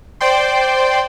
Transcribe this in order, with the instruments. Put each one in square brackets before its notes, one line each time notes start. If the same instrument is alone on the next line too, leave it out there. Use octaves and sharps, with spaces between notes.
[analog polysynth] C5 D5 G5 C6